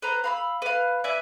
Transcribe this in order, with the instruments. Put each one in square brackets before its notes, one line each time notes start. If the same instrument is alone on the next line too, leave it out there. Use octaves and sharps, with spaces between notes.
[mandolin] B4 C5 A#5
F5 B5 E6
B4 F5
B4 D5 E5 G#5